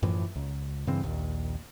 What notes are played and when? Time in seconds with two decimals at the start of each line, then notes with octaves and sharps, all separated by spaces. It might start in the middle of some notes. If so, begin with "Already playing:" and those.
0.03 F#2 A2 E3 F3
0.36 C#2
0.87 G2 C#3 E3 C4
1.03 A#1 D#2